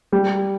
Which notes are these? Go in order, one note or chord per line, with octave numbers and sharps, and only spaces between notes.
G3